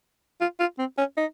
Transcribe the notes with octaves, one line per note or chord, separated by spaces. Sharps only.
F4
F4
C4
C#4
D#4